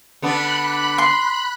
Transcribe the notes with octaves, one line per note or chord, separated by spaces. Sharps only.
D3 B3 D4 B5 F#6
C6